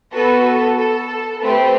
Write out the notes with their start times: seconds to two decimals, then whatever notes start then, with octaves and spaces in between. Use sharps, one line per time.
0.14 B3 F#4 A4 B4
0.46 A4
0.78 A4
1.41 A3 C4 G4 B4